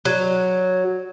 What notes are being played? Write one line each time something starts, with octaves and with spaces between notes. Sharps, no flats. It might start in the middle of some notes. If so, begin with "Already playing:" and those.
F#3